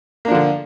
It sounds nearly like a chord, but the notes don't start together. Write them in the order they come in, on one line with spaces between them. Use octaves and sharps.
A#3 D4 F3 D3